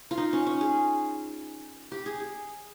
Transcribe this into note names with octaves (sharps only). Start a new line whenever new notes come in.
F4
D#4
C#4
C#4
G#4
G4
G#4
G#4